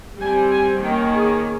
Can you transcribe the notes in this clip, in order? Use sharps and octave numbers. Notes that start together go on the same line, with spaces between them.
G3 C4 G#5
G#5
D#3 A#3 C#4 G5
G#4